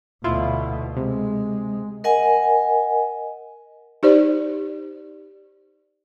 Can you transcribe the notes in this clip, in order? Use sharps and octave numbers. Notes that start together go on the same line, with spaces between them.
D2 B2 E4 F4
C3 G#3
A#4 D#5 F#5 G#5
D#4 G4 C5 D5